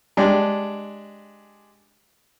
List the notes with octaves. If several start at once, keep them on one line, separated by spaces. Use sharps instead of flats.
G#3 D4 G4